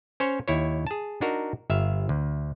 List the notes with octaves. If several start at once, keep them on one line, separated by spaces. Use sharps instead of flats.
C#4 C5 C#5
D#2 E4 C#5
G#4 A5
D4 D#4 F#4 A#4
G1 E5 F5
D2